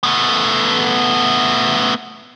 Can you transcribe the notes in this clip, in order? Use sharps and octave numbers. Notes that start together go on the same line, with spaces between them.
A3 B3